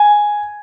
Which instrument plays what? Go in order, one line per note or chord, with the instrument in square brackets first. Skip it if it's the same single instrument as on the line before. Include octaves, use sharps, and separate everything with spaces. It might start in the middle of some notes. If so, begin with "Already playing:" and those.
Already playing: [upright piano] G#5